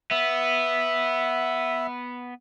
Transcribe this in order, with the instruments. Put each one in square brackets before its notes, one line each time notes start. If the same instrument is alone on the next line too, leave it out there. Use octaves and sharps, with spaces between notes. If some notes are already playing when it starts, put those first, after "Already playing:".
[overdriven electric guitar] B3 [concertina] E5